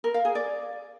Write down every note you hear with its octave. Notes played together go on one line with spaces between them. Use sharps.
A#4
F5
G#4
D5